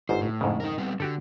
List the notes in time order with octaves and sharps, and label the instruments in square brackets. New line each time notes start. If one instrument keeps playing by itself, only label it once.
[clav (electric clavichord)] G1 G#2 [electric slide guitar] C5
[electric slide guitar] A2
[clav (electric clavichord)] F2 G#2 C#3
[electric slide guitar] D#4 A#4
G3 B3 C4
[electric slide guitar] D3 [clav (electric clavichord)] F#4 G4 A4